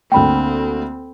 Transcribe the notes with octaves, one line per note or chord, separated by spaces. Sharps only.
D2 D3 A#3 C4 G5 B5